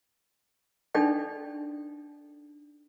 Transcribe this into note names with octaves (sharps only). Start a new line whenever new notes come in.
D4 D#4 A4 D5 G5